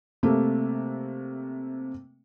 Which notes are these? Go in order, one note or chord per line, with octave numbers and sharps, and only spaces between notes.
C3 A3 A#3